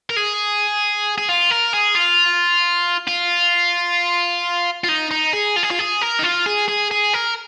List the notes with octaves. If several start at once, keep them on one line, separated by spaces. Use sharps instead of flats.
A#4
G#4
G#4
F4
A#4
G#4
F4
F4
F4
D#4
D#4
G#4
F4
G#4
F4
G#4
A#4
D#4
F4
G#4
G#4
G#4
A#4